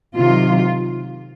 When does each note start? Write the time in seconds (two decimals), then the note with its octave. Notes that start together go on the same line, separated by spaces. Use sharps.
0.17 C3 D#3 F#3 F4